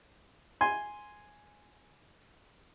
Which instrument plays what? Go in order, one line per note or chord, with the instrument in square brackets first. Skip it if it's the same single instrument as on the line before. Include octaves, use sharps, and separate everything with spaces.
[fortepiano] G#5 C6